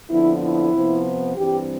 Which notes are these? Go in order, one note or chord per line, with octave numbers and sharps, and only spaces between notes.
F2 D3 F3 B3 E4
E4
C3 F3 B3
G2 E3 G3 C4 G4